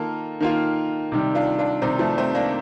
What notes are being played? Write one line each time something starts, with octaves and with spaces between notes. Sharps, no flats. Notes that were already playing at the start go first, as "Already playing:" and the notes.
Already playing: D#3 A#3 F4 A4
D#3 A#3 F4
C3 D#3 G3
D4 F4
D4 F4
C3 D#3 G3 C4 D#4
F3 A3
A3 C4
A#3 D4